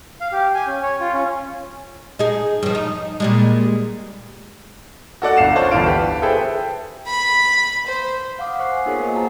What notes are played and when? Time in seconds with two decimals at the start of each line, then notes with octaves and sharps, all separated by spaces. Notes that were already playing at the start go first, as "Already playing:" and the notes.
0.21 F5
0.32 G4
0.54 G#5
0.67 C#4
0.82 C#5
1.01 F4
1.13 C#4
2.19 D#4 G#4
2.63 G2 F3
2.75 D#4
3.20 A#2 G3 G#3
5.22 F#4 A4 D5 F#5
5.37 G1 F5 C7 E7
5.56 C#4 D4 F4 C5 C#5 A5
5.71 G1 D2 E3 F4 F5 D7
5.86 G4 B4
6.22 G#4 A4 B4 C5 E5 G5
7.07 B5
7.87 C5
8.39 F5 F#5 D6 D#6
8.59 C5 C#6 F#6 C7
8.72 G#5
8.86 B3 D#4 F4 G#4 A#4 C#5
9.00 A#3 B4 C5 D#5 G#5
9.15 F#4 C5 F#5 A5 A#5